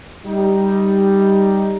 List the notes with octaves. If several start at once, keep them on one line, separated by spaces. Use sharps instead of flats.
G3 D#4